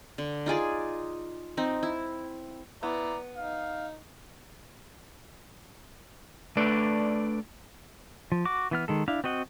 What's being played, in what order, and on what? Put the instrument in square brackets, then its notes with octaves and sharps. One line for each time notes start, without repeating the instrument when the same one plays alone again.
[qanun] D3
D#4 F4 G#4 D5
C4 D#4
E4
[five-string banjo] B3 [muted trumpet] E4 [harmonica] D5 A#5
[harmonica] D#4 [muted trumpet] F5
[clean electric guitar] A3 D4 B4 D5
[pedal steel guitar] F3
F#4 D6
E3 B3 F6
D#3 G#3 A4
D4 E4 F5
C4 F#4 D#5 F#5